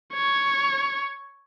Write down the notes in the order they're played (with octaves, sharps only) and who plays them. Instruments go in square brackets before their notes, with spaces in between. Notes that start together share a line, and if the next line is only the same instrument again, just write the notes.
[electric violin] C#5